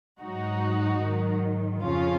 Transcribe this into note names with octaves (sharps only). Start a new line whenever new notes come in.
G#2 F#3 D#4 F#4
G#2 D#3 F#3
F2 C#3 F3 C#4 F4